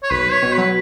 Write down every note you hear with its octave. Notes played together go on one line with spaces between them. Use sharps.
C#5
B1 B4
B1
C#5
B2
B4
F#3